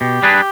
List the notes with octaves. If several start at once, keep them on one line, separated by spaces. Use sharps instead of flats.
B2 G4
G3 D4 G#4 B4